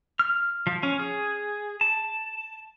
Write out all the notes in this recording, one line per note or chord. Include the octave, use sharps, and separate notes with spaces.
F6
F3
C#4
G#4
A5